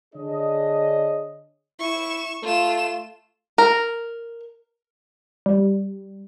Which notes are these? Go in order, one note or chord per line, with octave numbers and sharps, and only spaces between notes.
D3 D4 G#4 C#5 D#5
E4 C#6 E7
A3 F4 E7
A#4
G3